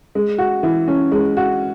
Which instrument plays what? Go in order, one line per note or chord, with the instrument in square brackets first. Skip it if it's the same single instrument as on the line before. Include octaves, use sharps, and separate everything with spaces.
[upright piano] G#3
F#4
E3
C#4
G#3
F#4